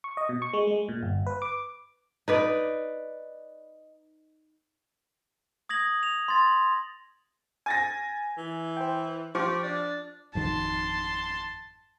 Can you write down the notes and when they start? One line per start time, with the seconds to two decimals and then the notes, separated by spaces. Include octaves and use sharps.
0.04 C#6
0.17 D#5
0.29 B2
0.42 C#6
0.53 G#3
0.67 G#3
0.89 A#2
1.03 G1
1.27 B4
1.42 D6
2.28 D#4 B4 D5
5.69 D#6 G#6 A#6 F#7
6.03 F7
6.28 C6 A6
7.66 G#5 A6 A#6
8.38 E3
8.77 C5 G5
9.35 F3 G4 C5 C#6 D6
9.63 D4 A6
10.35 G#1 F2 D#3 A5 C6